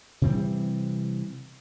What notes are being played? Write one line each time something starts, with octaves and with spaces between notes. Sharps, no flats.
C3 E3 G3 C4